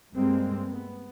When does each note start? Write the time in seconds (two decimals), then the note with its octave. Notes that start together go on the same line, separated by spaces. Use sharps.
0.14 G2 G3 G#3 A#3 C4
0.69 B3